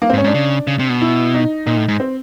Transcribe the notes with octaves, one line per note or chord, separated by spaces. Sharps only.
A#3
C4
G#2
C#4
G#2
D4
C#3
C#3
C3
B2
E4
D#4
A#2 D#4
A2
G#2
C4